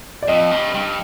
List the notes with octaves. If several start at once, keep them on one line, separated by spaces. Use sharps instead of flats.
D5
F2 D#5
G2
G2